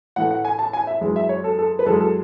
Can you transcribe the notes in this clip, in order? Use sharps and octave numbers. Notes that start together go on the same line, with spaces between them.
A2 E3 A3 F#5
F#5
G#5
A5
G#5
E5
F#2 E3 G#3
E5
C#5
A4
A4
B4
F#2 E3 G#3 A4
A4